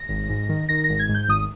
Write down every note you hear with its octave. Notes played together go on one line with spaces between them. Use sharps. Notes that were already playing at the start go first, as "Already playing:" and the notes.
Already playing: A#6
G#1
G#2
D#3
D#3 A#6
A#6
G#1
G#6
G#2
G6
G#1 D#6